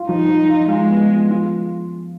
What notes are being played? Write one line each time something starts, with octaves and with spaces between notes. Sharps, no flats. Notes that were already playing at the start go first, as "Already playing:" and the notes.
Already playing: F4
F3 D#4
F3
F4
G#3 F4
B3
F3
F4